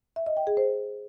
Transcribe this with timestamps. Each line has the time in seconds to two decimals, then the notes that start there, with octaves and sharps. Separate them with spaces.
0.16 E5
0.26 D#5
0.37 G5
0.47 G#4
0.57 C5